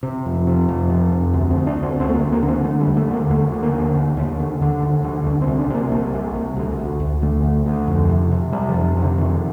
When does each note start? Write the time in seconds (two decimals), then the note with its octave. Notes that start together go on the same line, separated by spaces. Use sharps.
0.03 C3
0.26 F2
0.47 C3
0.69 F2
0.90 C3
1.12 F2
1.33 D2
1.51 C4
1.56 D2
1.66 D4
1.77 D2
1.83 C4
1.99 D2 C4
2.09 A3
2.15 A#3
2.21 D2
2.32 A#3
2.42 D3
2.48 C4
2.64 D3 A3
2.81 G3
2.87 D#2
2.97 A3
3.08 D3
3.13 A#3
3.30 D#2 A3
3.52 D3
3.63 A#3
3.74 D3
3.95 D#2
4.17 D#2
4.39 D3
4.61 D3
4.82 D#2
5.04 D3
5.26 C2 D4
5.42 C4
5.48 C3
5.59 D4
5.70 C3 A#3
5.91 C2 A#3
6.14 C3
6.36 C2
6.57 D2
6.79 D2
7.00 D2
7.22 D3 A3
7.44 D2
7.66 D2
7.88 F2
8.09 C3
8.32 C3
8.53 C3 G3
8.69 F3
8.74 F2
8.97 F2
9.02 D3
9.18 C3 D#3